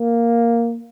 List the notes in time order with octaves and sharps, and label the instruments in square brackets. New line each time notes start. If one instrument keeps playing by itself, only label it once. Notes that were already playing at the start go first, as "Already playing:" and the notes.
Already playing: [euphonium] A#3